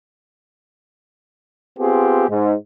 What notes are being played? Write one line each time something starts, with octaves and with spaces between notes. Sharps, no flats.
B3 C4 F4 G4 G#4
G#2